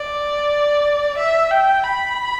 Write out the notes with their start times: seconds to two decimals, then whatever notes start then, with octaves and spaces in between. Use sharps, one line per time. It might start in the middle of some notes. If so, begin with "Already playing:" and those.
Already playing: D5
1.18 E5
1.51 G5
1.84 B5